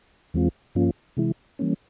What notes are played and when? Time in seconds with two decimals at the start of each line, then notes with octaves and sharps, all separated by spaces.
0.34 E2 E3 G#3 C4 F4
0.75 G2 F3 A#3 C#4 F4
1.17 C3 E3 G#3 E4
1.59 E3 G3 A#3 C#4